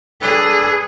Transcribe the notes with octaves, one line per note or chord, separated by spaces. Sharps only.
D4 G#4 A4 B4